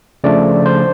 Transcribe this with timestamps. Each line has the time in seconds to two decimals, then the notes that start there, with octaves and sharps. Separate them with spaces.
0.24 C#3 F3 A3 D4 D5
0.66 C5